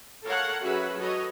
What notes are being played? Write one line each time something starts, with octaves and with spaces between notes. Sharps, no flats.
A4 A#4 C#5 F5 F#5
F#3 C#4 F#4 G#4 B4 E5
F#4 A4 B4 C#5 D#5